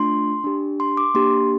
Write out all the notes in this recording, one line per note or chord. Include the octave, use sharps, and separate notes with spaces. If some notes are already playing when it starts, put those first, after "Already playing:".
Already playing: A3 D4 F4 C6
D4 G4
C6
D6
A#3 D4 G4 C6